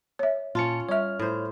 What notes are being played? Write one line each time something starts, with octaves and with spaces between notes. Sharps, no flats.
C#5 E5
A#2 C#4 F4 A5 C#7
G3 C#5 E5 F6
A2 C5